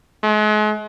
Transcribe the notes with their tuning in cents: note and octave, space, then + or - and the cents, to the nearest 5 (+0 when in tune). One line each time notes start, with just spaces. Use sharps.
G#3 +40